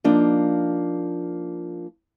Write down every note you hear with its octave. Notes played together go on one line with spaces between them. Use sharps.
F3 A#3 D4 D#4